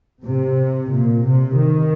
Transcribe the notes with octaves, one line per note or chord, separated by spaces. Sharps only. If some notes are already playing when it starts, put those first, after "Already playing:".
C3
A#2
C3
D#3